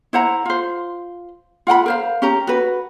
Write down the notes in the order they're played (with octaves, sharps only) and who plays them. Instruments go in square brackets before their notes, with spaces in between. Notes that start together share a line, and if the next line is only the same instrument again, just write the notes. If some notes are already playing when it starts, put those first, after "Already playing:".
[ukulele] E4 C5 F#5 A#5
F4 C5
F4 F#5 G5 B5
A#4 C5 F5
C#4 G4 A#5
F#4 B4